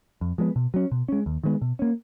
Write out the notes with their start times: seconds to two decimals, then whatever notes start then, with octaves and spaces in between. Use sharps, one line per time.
0.21 F2
0.38 F3 G#3 B3
0.56 B2
0.74 F#3 C#4
0.91 B2
1.08 G#3 C#4
1.26 D#2
1.43 D#3 G#3 B3
1.62 B2
1.79 A#3 C#4